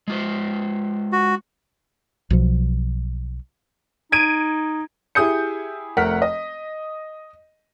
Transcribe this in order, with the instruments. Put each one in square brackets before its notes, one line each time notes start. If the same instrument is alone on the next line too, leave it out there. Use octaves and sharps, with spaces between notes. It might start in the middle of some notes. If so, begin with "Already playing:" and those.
[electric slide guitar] G#3 F4 C5
[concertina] F#4
[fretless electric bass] B1 B2 F3
[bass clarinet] D#4 [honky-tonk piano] G#6 D7 D#7
[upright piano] E4 G4 G#4 D#6 G6 C#7
F1 A3 A#4 F#5 F6 B6
D#5